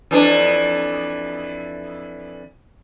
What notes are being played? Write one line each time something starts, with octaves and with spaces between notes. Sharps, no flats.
F2 E3 D4